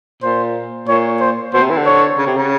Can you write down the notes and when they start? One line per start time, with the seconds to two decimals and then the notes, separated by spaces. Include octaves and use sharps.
0.23 A#2 C5
0.88 A#2 C#5
1.21 C5
1.53 B2 C5
1.61 C3
1.70 E3
1.77 D3
1.86 C#5
2.18 C#3
2.27 C3
2.37 C#3